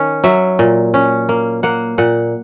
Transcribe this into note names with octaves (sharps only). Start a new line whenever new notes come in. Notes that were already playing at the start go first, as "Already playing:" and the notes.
Already playing: D#3 C#4
F#3 E5
A#2
C#4
A#3
A#3 F#5
A#2 F#5